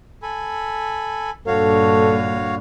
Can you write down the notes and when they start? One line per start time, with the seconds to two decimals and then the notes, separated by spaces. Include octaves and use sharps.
0.23 A4 G#5 B5
1.47 G2 A#2 D3 F#4 A4 C#5 F5